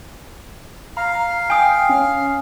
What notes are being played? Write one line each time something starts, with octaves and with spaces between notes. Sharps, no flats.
F5 A#5
G5 G#5 D#6
C#4